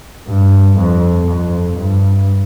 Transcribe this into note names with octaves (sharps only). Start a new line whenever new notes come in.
G2
F2
F2
G2